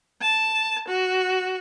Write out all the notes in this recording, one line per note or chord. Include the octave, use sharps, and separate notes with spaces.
A5
F#4